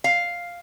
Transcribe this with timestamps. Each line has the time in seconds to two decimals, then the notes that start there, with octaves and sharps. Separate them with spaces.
0.04 F5